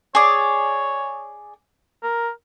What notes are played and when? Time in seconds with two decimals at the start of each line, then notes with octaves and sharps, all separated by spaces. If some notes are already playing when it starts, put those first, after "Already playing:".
0.15 G#4 C#5 D5
2.03 A#4